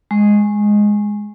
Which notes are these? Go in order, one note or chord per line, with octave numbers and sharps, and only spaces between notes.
G#3